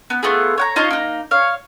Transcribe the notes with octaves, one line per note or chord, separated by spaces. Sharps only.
B3
A3 B3 F4 G#4
C#5 F#5 A#5
D#4 F4 C#5 D#5
A#3 D#4
C#5 F5